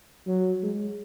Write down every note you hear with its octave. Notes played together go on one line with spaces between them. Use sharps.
F#3
G#3